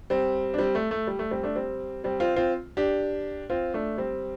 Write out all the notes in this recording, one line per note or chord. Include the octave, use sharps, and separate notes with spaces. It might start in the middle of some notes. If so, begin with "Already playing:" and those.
G3 C4
D4
G3 C4
A3
A3
G3
A3
G3 C4
A3 D4
G3 C4
G3 C4
C4 F4
C4 F4
D4 G4
C4 F4
A3 D4
G3 C4